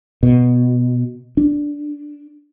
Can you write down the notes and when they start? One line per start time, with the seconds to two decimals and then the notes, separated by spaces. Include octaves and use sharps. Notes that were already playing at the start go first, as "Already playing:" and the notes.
0.23 B2
1.37 D4